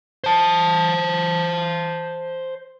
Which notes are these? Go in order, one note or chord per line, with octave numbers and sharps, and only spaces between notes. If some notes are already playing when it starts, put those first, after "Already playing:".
C5 A5